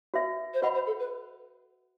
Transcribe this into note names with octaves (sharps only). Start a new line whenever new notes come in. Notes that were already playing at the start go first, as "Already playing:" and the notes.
F#4 B4 E5
C5
F#4 B4 D#5 F#5 B5
C5
A4
B4